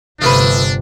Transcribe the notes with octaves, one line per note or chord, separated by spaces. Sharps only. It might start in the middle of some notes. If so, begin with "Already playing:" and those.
G1 C3 F3 A3 D4 B4